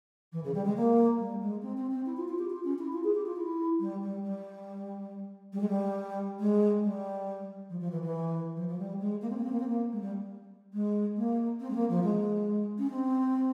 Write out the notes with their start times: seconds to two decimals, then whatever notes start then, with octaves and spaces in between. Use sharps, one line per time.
0.32 E3
0.43 C#3
0.54 G3
0.65 G#3
0.76 A#3
1.19 G3
1.41 G#3
1.62 C4
1.77 C4
1.91 C4
2.05 E4
2.16 F4
2.28 F4
2.38 G4
2.50 F4
2.64 C#4
2.78 E4
2.92 F4
3.03 G#4
3.14 G4
3.25 F4
3.36 E4
3.79 G3
4.01 G3
4.23 G3
5.53 G3
5.60 G#3
5.69 G3
6.39 G#3
6.83 G3
7.69 F3
7.80 F3
7.91 E3
8.02 E3
8.56 F3
8.68 F3
8.78 G3
9.00 G#3
9.21 A#3
9.29 C4
9.37 A#3
9.44 C4
9.51 A#3
9.59 C4
9.67 A#3
9.92 G#3
10.01 G3
10.73 G#3
11.17 A#3
11.60 C4
11.70 G#3
11.74 A#3
11.89 F3
12.03 G#3
12.78 C#4
12.90 C4